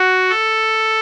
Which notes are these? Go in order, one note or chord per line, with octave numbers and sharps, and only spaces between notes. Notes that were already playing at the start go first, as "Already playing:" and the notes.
Already playing: F#4
A4